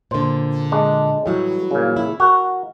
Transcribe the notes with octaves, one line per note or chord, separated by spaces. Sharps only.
A#2 D3 C5
G#3 D4
A2 E3 F#3 G3
A#2 C#3
A3 E4
F#4 A#4